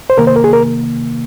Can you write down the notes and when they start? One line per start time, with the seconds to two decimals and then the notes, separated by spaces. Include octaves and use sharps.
0.10 C5
0.17 C3 D#3 A#3 A#4
0.27 C5
0.36 A#4
0.44 G#4
0.53 A#4